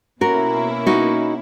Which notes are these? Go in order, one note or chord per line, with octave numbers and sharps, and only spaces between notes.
B2 A#3 C#4 E4 F#4 A#4
D#4 F#4